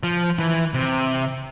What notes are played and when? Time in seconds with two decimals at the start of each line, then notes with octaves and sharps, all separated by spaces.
0.03 F3
0.39 E3
0.74 C3